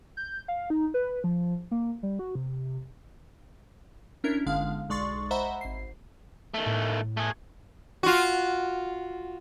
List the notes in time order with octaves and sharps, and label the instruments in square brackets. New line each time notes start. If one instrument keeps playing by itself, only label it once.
[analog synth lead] G6
F5
D#4
B4
F3
A#3
G3
F#4
C3
[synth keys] C#4 D4 E4 A#4
G1 D3 G#3 F5 F6
B1 G#3 D5 C6 C#6 A6
C5 D#5 E5 F#5 A#5 B5
G#1 C7
[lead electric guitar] D#3 A3
[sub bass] A2
[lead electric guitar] A3 G#4
[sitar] F4 F#4